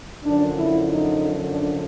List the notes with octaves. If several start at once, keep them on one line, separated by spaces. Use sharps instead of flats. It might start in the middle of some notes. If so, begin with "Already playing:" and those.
F#2 D3 F3 D4
E4
D#4
D4